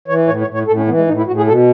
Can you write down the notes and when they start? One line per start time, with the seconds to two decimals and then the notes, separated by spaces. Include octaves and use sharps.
0.08 E3 C#5
0.27 A2 C#5
0.41 C#5
0.47 A2
0.54 C#5
0.67 A2 A4
0.77 C#4
0.87 E3 B3
0.97 G#3
1.07 A2 D#4
1.17 E4
1.27 A2 F#4
1.37 G#4
1.47 B2 A4